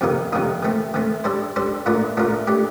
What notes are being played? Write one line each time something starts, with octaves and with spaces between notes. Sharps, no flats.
F2 C3 D#3 A#3 D#4
F2 C3 D#3 A#3 D#4
D#3 A3 C4
D#3 A3 C4
G3 D4 A4 C5
G3 D4 A4 C5
A#2 A3 D4 F4 A#4
A#2 A3 D4 F4 A#4
A3 D4 G4